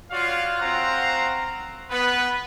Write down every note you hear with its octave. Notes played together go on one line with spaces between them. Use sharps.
F4 F#4 C#5 D5 F5
C4 F#4 C5 F5 F#5 A#5
B3 B4